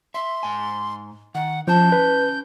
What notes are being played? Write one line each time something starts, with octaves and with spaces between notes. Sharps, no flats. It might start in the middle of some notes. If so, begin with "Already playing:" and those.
E5 C6
G#2 G#5
D#3 F#5
F3 C#4 A5 G6
B4